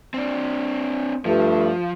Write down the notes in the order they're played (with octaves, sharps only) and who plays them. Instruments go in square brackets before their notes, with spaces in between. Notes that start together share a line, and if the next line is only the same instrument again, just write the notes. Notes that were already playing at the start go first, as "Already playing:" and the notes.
[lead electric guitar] C4 D4
[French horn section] G2 A3 [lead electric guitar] F3